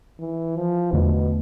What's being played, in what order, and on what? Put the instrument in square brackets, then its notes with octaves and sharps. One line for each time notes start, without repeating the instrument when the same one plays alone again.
[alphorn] E3
F3
[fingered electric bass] E2 D3 A3 [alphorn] B2